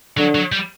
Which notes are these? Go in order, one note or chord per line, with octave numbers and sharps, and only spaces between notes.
D3 F#3
F#3
G3